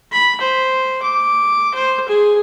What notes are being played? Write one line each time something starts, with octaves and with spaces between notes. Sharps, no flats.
B5
C5
D6
C5
G#4